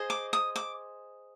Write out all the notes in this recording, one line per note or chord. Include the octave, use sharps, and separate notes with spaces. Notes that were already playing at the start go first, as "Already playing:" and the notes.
Already playing: G#4 C5 D#5
D6
D#6
D6